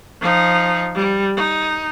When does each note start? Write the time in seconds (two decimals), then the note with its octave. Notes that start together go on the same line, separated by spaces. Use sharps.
0.21 F3 D#4
0.95 G3
1.37 D#4